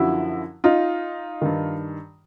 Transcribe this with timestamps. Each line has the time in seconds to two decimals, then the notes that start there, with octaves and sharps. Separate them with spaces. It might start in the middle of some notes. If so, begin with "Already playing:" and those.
Already playing: F#2 D3 F3 E4 F#4
0.64 D#4 F4
1.42 G2 D#3